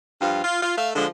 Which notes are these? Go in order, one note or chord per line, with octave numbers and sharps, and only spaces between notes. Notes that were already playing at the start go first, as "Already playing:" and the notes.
G2 F3 F4
F4
F4
A3 E5 F5
D3 F3 G#3